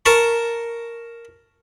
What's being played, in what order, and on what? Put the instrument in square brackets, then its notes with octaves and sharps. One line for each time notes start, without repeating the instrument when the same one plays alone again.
[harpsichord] A#4 A5 A#5 C#6